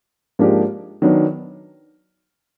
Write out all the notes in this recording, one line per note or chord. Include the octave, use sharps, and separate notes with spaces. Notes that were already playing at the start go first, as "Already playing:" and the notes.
G#2 F3 A#3 D4 G4
D#3 F#3 B3 D4